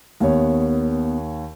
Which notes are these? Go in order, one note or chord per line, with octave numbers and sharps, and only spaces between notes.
D#2 B3 C#5